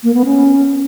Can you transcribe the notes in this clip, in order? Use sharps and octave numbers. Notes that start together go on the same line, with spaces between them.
A#3
B3
C#4